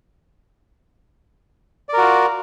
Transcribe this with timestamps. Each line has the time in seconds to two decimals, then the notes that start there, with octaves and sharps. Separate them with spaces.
1.89 D5
1.93 A#4
1.98 F#4
2.02 F4